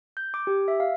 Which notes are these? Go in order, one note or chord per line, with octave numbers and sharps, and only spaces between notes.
G6
D6
G4
E5
F5